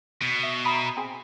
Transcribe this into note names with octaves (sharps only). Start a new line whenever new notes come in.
B2
E5
A#5 B5 D#6
C4 G#4